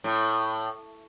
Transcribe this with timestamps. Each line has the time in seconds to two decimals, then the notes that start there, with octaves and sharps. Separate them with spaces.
0.04 A2